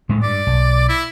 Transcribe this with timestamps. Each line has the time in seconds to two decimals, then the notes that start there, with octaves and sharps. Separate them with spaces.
0.09 A2 G#3 A3
0.23 G2 D5
0.47 B1
0.89 E4